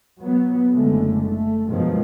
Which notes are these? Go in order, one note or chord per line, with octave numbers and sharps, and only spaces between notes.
F#3 B3
F#1 D3 G#3 A3
A3
G2 B2 D#3 F3 F#3 G#3